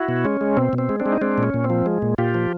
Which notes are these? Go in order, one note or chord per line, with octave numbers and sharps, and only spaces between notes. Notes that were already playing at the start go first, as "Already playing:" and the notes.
Already playing: E4 F#4
B2
G#3 C#4
G#3
B2 C4
B2
C4
G#3
C4 D4
G#3
D#4
G#3 C4 D4
A#2
C#4
A#2
C4
F3
G#3
A#2
A#2 F4 G4
F3